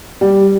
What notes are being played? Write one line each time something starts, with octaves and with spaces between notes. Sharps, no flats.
G3